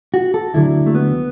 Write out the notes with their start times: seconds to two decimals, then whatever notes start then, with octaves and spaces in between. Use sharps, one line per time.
0.14 F#4
0.34 A4
0.54 D2 D3 F#3 E4
0.86 A3
0.95 B3